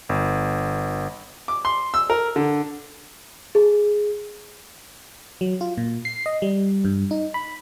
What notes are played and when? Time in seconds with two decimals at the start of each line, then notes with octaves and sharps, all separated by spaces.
0.09 G1
1.48 D6
1.65 C6
1.94 E6
2.10 A#4
2.36 D3
3.55 G#4
5.41 F#3
5.61 F4
5.78 A#2
6.05 C7
6.26 D#5
6.42 G3
6.85 G2
7.11 D#4
7.34 B5